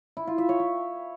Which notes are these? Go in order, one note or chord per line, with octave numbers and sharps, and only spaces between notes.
E4
F4
E5
C#5
E5